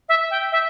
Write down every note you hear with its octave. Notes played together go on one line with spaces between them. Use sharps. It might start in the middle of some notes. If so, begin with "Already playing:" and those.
E5
G5
E5